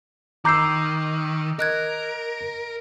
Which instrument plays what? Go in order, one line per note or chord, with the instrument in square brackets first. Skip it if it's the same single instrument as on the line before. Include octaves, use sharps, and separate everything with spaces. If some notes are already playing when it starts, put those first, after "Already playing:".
[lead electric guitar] D#3 [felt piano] A#5 E6 [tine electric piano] D6 G6 C7
[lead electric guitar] A#4 [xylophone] D#5 F#6 G#6